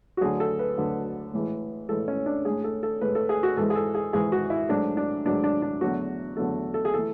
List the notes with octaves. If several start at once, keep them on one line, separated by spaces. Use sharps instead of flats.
F#4
D2 D3 F#3 G#4
A4
B4
D2 D3 F#3
A2 E3 G#3
A2 E3 G#3 A4
C#4
D4
A2 G#3 G#4
A4
A4
A2 G#3 B4
A4
G#4
F#4
G#2 E3 G#3 A4
G#4
A4
G#4
G#2 E3 G#3 G#4
F#4
E4
G#2 F#3 A3 D4
D4
G#2 F#3 A3 D4
D4
D4
E2 D3 F#3 A3 F#4
E2 D3 F#3 A3 A4
A4
G#4
E3 A3 A4